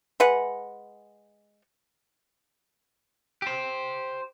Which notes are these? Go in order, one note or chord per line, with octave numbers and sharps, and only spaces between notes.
G#3 B4 F#5
G4 C5